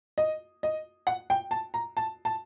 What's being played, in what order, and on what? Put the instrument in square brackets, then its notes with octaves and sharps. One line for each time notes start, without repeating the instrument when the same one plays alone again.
[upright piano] D#5
D#5
F#5
G5
A5
A#5
A5
A5